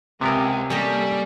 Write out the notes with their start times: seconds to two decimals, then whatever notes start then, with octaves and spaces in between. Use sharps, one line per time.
0.21 C#2 C3 B3 C4 G4 A#4 G#5
0.70 G3 A#3 C#4 G4 A4 D#5